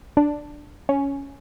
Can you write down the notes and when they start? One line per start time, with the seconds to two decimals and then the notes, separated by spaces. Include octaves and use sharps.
0.17 D4
0.89 C#4